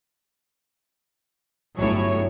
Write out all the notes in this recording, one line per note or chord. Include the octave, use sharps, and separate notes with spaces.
G1 A2 F#3 E4 C#5